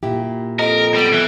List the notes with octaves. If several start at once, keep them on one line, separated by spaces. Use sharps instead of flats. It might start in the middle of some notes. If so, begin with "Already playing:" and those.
A#2 E4 G4
F2 A#4 D#5 D7
G3 B3 D7
E3